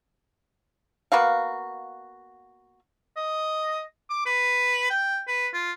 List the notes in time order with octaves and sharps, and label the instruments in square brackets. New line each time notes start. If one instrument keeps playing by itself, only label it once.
[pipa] A#3 B3 F#4 F5
[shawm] D#5
D6
B4
G5
B4
F4